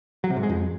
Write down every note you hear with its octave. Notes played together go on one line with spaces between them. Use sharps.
F#3
C3
G#2
G#3
F2